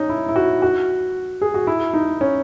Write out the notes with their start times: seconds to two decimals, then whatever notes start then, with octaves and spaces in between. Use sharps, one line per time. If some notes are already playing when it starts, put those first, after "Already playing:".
Already playing: C#4 D#4
0.09 E4
0.29 E4
0.36 F#4
0.62 F#4
1.42 G#4
1.54 F#4
1.67 E4
1.94 D#4
2.21 C#4